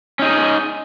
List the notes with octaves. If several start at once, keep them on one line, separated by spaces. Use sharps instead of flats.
C#4 D#4 G#4